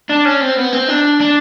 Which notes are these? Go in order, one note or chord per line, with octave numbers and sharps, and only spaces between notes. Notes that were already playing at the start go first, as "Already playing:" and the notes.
D4
C#4
C4
B3
C4
D4
D4